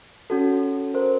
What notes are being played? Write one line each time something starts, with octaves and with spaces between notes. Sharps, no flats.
C#4 F#4 A4
A#4 C5